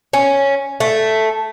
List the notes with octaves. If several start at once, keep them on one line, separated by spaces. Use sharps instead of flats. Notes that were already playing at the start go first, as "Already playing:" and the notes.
C#4
A3